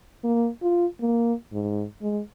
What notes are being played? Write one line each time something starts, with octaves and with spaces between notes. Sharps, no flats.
A#3
F4
A#3
G#2
G#3